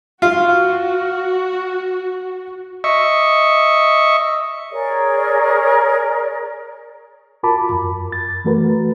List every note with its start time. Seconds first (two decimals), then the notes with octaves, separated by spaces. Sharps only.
0.22 F4 F#4
2.84 D#5 E5 C#6
4.72 G#4 A#4 C#5 D5
7.43 F4 F#4 A#4 A5 B5 D6
7.71 F#2
8.12 A6
8.45 E3 A3 F#4 A#4 B4